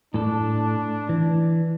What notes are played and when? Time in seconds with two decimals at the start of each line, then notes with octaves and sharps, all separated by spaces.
0.14 A2 D4 A4
1.09 E3